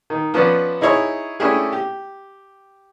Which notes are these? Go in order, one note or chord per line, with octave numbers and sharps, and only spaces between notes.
D#3
F3 B3 C#4 B4 D5
D#4 E4 G#4 C#5
A3 C#4 D4 E4 G4 G#4
G4